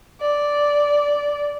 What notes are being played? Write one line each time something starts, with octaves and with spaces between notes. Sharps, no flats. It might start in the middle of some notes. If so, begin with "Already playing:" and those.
D5